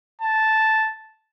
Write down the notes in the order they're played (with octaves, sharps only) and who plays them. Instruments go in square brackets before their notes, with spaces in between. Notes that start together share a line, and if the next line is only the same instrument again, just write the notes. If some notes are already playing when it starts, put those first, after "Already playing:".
[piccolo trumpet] A5